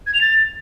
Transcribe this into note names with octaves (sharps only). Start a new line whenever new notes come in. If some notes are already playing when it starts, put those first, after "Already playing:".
G#6
F7
A6